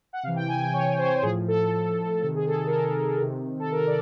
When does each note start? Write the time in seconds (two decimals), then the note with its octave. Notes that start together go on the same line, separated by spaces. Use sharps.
0.13 F#5
0.23 C3 F5
0.27 E3
0.36 G5
0.48 G#5
0.61 G5
0.73 C#5
0.98 C5
1.22 A2 F3 G#4
1.48 A4
2.22 C3 D#3 A4
2.35 G#4
2.47 A4
2.66 A#4
2.72 A4
3.21 C3 D#3
3.59 A4
3.72 A#4
3.87 D5